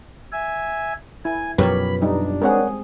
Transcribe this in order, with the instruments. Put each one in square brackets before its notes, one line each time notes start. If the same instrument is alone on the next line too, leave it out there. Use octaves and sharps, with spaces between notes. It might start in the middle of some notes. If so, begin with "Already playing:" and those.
[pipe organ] E5 G#5
[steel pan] E4 [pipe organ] G#5
[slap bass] F#2 B2 F3 [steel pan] G4 A#4 C#5 [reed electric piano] B4 [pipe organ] B5
[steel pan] G3 D#4 [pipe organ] D4
[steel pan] G#3 C4 G#4 [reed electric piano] A#4 C#5 F#5